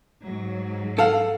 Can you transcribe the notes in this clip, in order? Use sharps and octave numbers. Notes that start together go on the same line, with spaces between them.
G#2 F#3
A4 F5 F#5